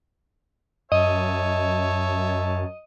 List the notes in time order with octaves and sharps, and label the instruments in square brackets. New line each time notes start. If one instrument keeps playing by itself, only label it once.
[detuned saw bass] F#2 [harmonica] C#5 E5 A5 [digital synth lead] D#5